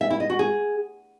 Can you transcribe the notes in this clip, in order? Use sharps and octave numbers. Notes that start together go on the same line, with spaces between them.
E5
E4
D#5
F#4
G#4